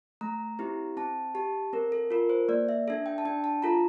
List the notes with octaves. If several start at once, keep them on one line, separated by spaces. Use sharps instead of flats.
A3 A#5
C4 E4 G4
C4 A5
G4 A5
C4 A#4
A4
F4 A4 A#4
C5
A#3 D5
E5
D4 A4 E5
G5
A5
D4 G5
A5
F4 A4 A#5